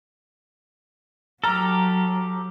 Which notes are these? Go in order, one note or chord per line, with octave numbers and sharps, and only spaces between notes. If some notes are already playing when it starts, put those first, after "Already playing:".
F#3 G4 A4 A#5 F6